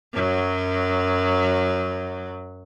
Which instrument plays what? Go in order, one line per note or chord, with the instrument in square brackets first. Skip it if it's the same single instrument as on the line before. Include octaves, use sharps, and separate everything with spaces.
[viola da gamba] F#2 F#3